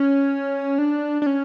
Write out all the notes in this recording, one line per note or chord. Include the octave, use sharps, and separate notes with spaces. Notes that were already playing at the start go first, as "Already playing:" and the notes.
Already playing: C#4
D4
D4
C#4